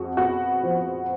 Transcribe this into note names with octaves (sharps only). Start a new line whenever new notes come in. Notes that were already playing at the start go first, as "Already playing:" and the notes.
Already playing: F2 G#3 F#4
B3 F#4
F3